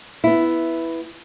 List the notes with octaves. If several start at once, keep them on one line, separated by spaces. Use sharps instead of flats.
B3 E4